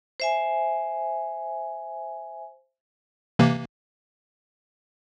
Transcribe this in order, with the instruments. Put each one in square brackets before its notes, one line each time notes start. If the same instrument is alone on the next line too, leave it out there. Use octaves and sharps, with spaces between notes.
[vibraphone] C5 E5 G#5
[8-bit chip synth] C3 E3 A#3